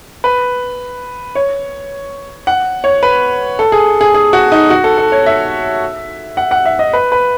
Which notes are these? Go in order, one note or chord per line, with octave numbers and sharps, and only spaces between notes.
B4
C#5
F#5
C#5
B4
A4
G#4
G#4
G#4
F#4
D#4
F#4
A4
A4
C#5
E5
F#5
F#5
E5
D#5
B4
B4